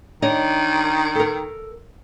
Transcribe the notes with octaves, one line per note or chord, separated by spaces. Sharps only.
D#3 D4 C#5 D#5
A4 A#4